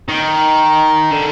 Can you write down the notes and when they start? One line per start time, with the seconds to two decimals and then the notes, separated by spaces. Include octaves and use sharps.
0.09 D#3
1.12 D3